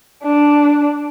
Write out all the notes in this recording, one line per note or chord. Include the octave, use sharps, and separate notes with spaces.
D4